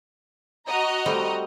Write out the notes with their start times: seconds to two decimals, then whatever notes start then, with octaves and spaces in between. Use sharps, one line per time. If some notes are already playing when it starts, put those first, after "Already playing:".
0.68 F#4 D#5 A#5
1.06 G3 A3 C4